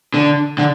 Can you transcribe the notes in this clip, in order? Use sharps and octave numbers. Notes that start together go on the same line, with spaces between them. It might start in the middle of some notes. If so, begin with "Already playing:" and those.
D3
D3